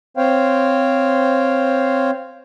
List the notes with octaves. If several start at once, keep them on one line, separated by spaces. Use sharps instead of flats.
C4 C5 C#5 F5 G5